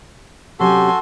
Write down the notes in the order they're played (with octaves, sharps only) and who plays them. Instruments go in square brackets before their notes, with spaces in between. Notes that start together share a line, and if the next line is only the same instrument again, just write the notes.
[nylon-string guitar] C3 F#3 C#4 [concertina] F#4 A4 [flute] G4 [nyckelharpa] G#5 C6